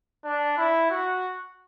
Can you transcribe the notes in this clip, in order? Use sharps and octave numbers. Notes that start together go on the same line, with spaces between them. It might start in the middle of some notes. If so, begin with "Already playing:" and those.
D4
E4
F#4